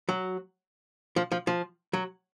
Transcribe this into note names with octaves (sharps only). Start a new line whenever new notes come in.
F#3
F3
F3
F3
F#3